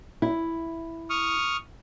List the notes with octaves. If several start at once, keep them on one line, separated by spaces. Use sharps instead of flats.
E4
C#6 D#6 F6